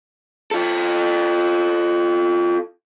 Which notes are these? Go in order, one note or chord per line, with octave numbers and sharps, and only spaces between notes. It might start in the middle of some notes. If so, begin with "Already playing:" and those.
F4 A4